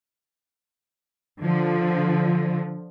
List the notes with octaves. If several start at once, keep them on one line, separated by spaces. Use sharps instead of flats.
D3 F3